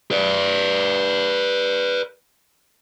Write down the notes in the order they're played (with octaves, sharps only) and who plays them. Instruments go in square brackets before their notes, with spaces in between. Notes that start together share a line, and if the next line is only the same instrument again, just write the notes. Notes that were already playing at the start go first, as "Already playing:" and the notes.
[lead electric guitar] B4 D5